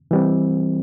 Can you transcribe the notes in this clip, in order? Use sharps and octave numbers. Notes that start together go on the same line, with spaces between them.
E3 G3 C4